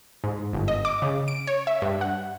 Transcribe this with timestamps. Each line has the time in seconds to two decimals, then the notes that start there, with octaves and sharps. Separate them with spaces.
0.24 G#2
0.53 G1
0.68 D#5
0.85 D6
1.02 C#3
1.28 D7
1.47 C#5
1.67 E5
1.82 G2
2.01 F#5